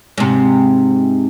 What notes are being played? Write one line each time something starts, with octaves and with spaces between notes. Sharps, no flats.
G#2 C3